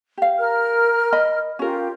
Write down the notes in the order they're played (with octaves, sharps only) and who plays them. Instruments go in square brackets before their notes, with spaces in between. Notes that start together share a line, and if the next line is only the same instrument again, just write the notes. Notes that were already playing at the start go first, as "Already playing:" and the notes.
[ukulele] G4 F5
[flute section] A#4 F6
[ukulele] D#5 B5
[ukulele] C#4 A#4 [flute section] F4 G4